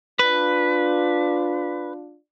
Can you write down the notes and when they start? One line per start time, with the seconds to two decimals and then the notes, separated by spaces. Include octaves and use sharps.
0.19 D4 F4 B4